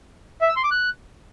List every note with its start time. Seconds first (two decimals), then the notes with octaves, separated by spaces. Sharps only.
0.41 E5
0.49 E6
0.56 C6
0.64 D6
0.71 F#6